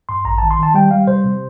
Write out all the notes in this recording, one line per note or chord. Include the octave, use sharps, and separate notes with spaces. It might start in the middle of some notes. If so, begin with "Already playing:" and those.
G2 C6
A1 A#5
A5
D#3
C6
D#3 A5
G3 G5
G3 F5
C3 C5
C3